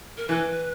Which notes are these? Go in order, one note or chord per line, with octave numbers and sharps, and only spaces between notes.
A#4
E3 B4